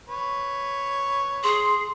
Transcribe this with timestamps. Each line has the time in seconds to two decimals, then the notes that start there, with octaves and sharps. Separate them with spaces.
0.07 B4 C#5
1.44 G#4 C6